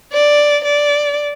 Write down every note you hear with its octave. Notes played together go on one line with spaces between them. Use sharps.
D5
D5